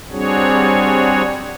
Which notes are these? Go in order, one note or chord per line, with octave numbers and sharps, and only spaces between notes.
G3 C4 D4 F#4 G#4 C#5